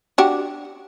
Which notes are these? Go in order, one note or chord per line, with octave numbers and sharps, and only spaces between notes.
D4 F#4 G4